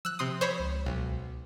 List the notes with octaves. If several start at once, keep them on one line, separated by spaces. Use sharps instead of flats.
F3 E6 F#6
C3 C6 D#6
C5 C#5 B5
C#2
B1